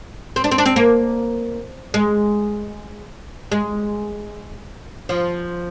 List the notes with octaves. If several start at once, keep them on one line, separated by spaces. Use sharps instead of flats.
C4
D4
C4
D4
C4
A#3
G#3
G#3
F3